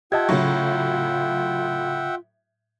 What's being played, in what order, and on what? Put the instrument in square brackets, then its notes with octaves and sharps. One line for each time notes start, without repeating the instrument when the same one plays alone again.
[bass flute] F4 [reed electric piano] G4 D#5 A5 [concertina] E5 F#5 G5 [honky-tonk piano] G#6
[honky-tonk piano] A2 F#3 [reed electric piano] C#3 C#6